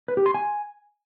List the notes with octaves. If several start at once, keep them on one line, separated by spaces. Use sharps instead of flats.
B4
G4
C6
G#5